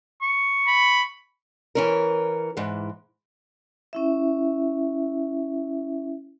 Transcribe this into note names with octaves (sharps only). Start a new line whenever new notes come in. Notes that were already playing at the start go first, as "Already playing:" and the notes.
C#6
B5
E3 C#4 A#4
G#2 E3
C#4 E4 E5